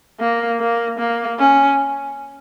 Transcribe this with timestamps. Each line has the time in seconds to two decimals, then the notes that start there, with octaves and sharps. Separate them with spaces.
0.20 A#3
0.60 A#3
0.99 A#3
1.39 C#4